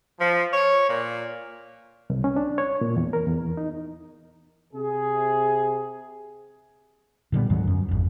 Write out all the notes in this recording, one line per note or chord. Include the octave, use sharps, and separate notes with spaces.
F3
C#5
A#2
C2
C#4
D4
C#5
A#2
E2
A#4
E2
D#4
C3 G#4
A#2 D3 G3 B3
D2 G#2 D#3 F#3
F#2
G#1 F2